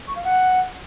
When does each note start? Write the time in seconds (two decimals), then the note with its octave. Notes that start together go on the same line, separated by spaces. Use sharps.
0.08 C#6
0.16 F5
0.24 F#5